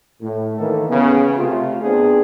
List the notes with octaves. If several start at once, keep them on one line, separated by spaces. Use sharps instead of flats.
A2
D#3 E3 A#3 A4
C#3 B3
C3 A3 F4
B3 C4 D4 G#4